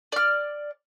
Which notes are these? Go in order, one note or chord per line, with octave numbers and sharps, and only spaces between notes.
D5 F6